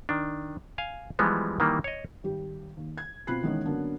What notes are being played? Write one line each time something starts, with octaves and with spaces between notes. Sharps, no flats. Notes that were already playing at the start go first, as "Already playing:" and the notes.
D#3 D4
F5 G#5
E3 F3 G3 G#3 B3
D#3 E3 G3 A#3
C#5 D#5
G#1 G3 G4
D#2
G#6
B2 C4 F4 B5 F#6 C7
D#3 E3 G#3 B3 C#4 D#4
D3 F#3 A#3 B3 C#4 D4